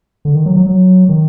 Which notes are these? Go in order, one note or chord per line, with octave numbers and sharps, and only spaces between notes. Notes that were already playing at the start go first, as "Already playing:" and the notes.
D3
D#3
F#3
F#3
F#3
D#3